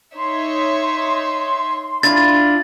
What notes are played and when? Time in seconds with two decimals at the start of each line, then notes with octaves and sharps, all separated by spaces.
0.16 D#4 C#5 E5 C6
2.03 D4 E4 F4 A6